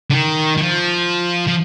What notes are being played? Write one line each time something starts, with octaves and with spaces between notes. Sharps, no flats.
D3
D#3
D#3
F3
F3